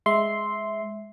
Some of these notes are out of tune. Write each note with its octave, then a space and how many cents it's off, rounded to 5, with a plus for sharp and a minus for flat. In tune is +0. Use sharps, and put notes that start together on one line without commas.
G#3 +0 E5 -10 C6 +0